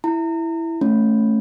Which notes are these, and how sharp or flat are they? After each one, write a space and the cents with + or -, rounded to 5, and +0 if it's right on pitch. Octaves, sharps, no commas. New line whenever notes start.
E4 +0 A#5 -35
A3 +0 C#4 -10 B5 +0